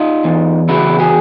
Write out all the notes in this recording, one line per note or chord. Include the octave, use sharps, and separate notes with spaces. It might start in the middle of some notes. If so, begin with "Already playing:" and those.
Already playing: D#4 F4
E2
C#3 E4 F#4
F#4 G#4